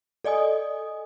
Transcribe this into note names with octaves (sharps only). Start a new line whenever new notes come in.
A4 D5 D#5 G#5 D#6